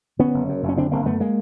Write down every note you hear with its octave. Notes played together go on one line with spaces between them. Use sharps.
D3 B3 C#4
F#1
F#2
F#1
C#4
D3 C4 D4
F#1 A#3 C4
F#2 A3 B3
G#3 A#3